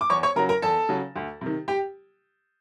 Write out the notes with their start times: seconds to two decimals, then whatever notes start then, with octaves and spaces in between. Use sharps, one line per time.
0.01 D6
0.10 E2 C#5 C#6
0.23 C#5 C#6
0.36 C#3 F#3 A#4 A#5
0.49 A#4 A#5
0.62 E2 A4 A5
0.89 C#3 F#3
1.16 D2
1.41 C3 D#3
1.68 G4 G5